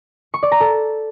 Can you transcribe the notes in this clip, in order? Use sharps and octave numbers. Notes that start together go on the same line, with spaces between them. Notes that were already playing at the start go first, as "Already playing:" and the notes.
C#6
D5
A#5
A4